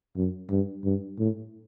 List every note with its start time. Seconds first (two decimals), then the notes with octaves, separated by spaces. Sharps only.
0.17 F#2
0.50 G2
0.85 G2
1.19 A2